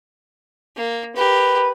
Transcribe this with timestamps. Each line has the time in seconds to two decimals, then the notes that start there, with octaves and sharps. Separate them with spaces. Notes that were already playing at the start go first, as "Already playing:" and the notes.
0.77 A#3
1.16 G4 A#4 B4